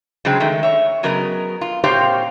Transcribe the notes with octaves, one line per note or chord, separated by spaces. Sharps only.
C#3 F#3 G#3 C4
D#3 G#3 A3
C#5 E5
C#3 F#3 B3 A#4 D#5
F4
A#2 C4 G4 C5 C#5 F5